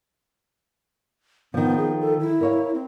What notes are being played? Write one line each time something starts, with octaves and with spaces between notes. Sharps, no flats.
D#3 F3 B3
G#4
A4
E4
A#4 C#5 F5
C4